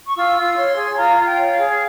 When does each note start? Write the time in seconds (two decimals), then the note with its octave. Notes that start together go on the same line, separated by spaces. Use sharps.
0.06 C#6
0.16 F4 E6
0.37 F4
0.57 C#5 C6
0.76 G#4
0.96 F4 A#5
1.18 F4
1.24 G5
1.37 C#5
1.51 F5
1.58 G#4